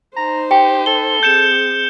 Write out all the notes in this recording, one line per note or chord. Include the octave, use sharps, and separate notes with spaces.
D#4 C5 A#5
G4 G5
A4 G7
C4 G#4 G6 C#7 E7